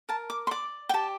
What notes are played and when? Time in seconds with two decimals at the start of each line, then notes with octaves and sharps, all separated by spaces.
0.09 A#4 A5
0.30 D6
0.47 C6
0.51 D5 D6
0.89 G5
0.94 G4 A5